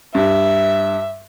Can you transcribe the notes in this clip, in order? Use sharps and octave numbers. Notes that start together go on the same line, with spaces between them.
G2 E5